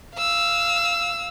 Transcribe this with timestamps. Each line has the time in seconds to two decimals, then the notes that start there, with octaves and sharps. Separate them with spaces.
0.15 F5 E6